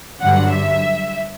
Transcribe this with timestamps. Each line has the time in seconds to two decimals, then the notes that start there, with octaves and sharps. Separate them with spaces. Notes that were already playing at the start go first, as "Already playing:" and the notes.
0.21 G2 D3 F#3 F#5
0.54 E5